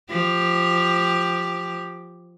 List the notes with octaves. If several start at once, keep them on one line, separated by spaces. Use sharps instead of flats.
F3 G4